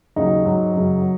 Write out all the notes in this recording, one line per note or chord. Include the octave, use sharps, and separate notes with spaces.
D#2 C#3 F#3 D#4
G#2 F#3
F#2 C#3 F#3
F#3